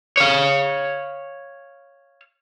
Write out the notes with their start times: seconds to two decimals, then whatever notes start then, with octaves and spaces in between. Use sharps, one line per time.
0.17 C#5 F5